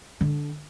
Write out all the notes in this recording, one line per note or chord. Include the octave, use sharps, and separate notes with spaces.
D3